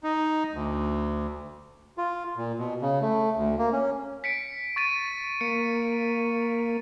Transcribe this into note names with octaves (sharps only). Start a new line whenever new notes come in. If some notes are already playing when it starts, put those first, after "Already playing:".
D#4
D2
F4
A#2
B2
C#3
A3
D2
A#3
C#4
B6 C#7 D7
C#6 A6 D#7
A#3 C#7